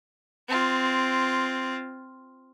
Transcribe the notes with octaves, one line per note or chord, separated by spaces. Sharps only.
C4 F4